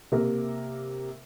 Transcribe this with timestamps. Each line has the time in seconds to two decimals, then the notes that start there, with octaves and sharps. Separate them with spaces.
0.12 C3 A#3 A#4